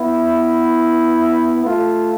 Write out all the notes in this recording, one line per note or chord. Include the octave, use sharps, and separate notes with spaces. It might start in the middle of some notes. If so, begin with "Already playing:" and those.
Already playing: B3 E4
A3 F4